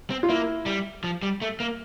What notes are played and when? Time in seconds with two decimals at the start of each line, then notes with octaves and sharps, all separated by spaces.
0.10 C4
0.23 F4
0.29 A#3 E4
0.66 G3
1.04 F3
1.22 G3
1.42 A3
1.60 A#3